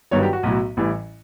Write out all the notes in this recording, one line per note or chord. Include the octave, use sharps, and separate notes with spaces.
G1 G2 D#3 F#3 C#5
G4
F#4
B1 A2 F#3
A1 A2 E3 G3